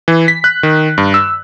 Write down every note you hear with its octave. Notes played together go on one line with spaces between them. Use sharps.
E3
B6
F#6
D#3
G2
E6